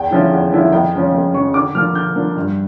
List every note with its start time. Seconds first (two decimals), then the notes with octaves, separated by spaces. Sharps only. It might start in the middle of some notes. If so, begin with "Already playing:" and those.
Already playing: E2 G5
0.11 D3 F3 C#4 E4
0.32 E2
0.52 D3 F3 C#4 E4
0.72 F2 G5
0.94 C#3 F3 C#4
1.14 F2
1.34 C#3 F3 C#4 C#6
1.54 D3 D6
1.75 F3 A#3 D4 F6
1.95 D3 G6
2.16 F3 A#3 D4
2.36 G2